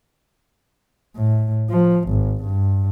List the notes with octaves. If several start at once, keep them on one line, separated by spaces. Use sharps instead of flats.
A2
F3
G#1
G2